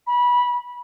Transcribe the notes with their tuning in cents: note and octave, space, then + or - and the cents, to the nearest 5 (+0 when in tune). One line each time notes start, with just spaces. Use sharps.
B5 -20